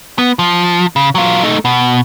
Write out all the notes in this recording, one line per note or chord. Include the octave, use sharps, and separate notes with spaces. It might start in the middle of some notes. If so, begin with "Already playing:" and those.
B3
F3
C#3
F#3 F4
A3 D#4
B2